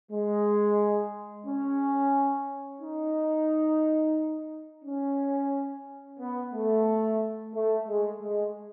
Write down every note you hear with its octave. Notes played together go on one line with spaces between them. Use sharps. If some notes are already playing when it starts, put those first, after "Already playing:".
G#3
C#4
D#4
C#4
B3
A3
A3
G#3
G#3